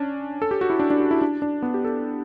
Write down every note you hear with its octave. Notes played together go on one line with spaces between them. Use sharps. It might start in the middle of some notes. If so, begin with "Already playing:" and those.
Already playing: C#4 D4
A4
G4
F#4
E4
D4
D4
F#4
E4
D4
D4
B3
G4
A4